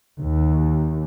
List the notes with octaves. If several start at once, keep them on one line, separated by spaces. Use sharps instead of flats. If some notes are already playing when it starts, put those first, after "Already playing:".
D#2